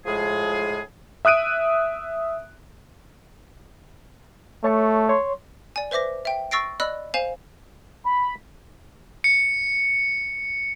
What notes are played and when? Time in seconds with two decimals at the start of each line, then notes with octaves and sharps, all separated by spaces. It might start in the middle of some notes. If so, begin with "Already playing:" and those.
0.06 A2 F3 G#3 G#4
1.25 E5 D#6 F#6 D7 D#7
4.64 A3 C#5 A5 C#6
5.09 C#5 C6
5.76 D5 G#5
5.91 B4 C5 E5 D6 A#6
6.25 E5 G5
6.51 C#6 E6 A6 A#6 C7 D7
6.80 D5 D#5 B5 E6 F#6
7.14 C5 F5 G#5 E7 F7
8.06 B5
9.24 C#7